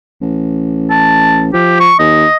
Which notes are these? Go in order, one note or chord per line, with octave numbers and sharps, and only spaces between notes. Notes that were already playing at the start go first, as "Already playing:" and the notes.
A1
A5
F3 G4
C#6
D#2 D#5